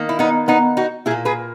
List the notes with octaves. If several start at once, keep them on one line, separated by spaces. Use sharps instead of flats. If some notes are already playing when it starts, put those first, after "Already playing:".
Already playing: D#3 A#3
E4
B3 D#4
B3 D#4
D#4 F#4
A#2 A#3 E4 G#4
G#4 B4